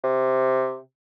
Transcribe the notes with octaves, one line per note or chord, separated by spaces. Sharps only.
C3